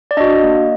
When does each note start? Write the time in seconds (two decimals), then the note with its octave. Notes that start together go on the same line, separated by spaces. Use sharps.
0.11 D5
0.17 D4 F#4 D#5
0.43 A#3